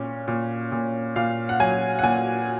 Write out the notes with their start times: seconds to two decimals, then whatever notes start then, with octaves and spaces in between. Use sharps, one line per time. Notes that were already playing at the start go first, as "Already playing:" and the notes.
Already playing: A#2 C#4
0.28 A#2
0.72 A#2
1.16 A#2 F5
1.49 F#5
1.60 F#3 G#5
1.99 F#5
2.03 A#2 G#5